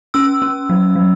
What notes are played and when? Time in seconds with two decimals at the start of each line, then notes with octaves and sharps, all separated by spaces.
0.14 C#4 E6
0.42 C#4
0.70 F#3
0.96 F#3